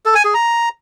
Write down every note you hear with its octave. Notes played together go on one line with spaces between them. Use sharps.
A4
G#5
G#4
A#5